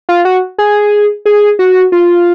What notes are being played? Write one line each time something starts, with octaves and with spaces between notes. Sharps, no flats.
F4
F#4
G#4
G#4
F#4
F4